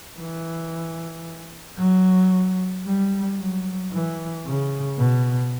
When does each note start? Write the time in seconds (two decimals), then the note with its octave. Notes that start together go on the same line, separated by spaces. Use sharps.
0.19 E3
1.78 F#3
2.85 G3
3.39 F#3
3.92 E3
4.45 C#3
4.98 B2